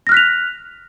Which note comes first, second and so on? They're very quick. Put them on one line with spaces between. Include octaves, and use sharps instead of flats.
A#6 F6 F#6 B6 F7